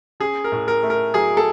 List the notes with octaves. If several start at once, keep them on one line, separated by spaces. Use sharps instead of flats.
C#4 G#4
A#4
A2
A#4
A3
A#4
F#3 G#4
A4